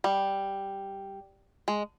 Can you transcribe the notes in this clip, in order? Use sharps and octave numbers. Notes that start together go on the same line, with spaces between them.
G3
G#3